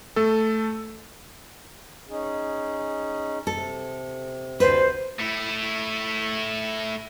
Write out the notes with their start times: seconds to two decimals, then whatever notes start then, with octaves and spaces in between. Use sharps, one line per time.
0.16 A3 A4
2.07 C#4 D#4 G#4
3.47 C3 A4
4.60 D2 B4 C5
5.20 A3 E4